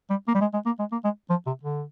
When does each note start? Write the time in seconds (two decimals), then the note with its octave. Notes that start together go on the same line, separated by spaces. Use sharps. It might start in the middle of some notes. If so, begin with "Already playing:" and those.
0.10 G3
0.28 A#3
0.35 G3
0.41 G#3
0.54 G#3
0.66 A#3
0.79 G#3
0.92 A#3
1.04 G#3
1.30 F3
1.47 C3
1.63 D3